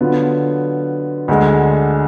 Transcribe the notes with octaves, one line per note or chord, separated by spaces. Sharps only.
D3 F#3 B3 F4
D2 D3 G#3